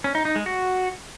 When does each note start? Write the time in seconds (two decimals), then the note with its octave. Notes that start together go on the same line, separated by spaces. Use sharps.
0.04 C#4
0.15 D#4
0.25 D#4
0.36 G#3
0.46 F#4